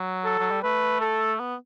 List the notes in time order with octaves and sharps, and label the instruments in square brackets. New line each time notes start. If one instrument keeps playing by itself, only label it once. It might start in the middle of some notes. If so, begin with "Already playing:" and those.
Already playing: [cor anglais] F#3
[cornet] A4
[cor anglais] F#3
G3
[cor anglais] A3 [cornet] B4
[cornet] A4
[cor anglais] B3